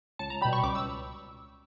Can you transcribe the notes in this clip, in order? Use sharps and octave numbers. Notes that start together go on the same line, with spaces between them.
C#2 A5
A#5
B2 G3 B5
C#6
C#2 D6
E6